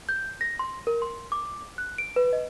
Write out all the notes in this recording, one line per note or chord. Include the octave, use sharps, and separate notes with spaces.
G6
A#6
C6
A#4
C6
D6
F#6
D7
B4
D#5